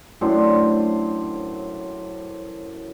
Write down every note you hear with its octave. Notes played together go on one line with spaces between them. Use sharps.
F#2 A2 D4 C5